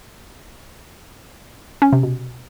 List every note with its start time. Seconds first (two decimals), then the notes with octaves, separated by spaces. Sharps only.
1.82 C#4
1.93 C3
2.03 B2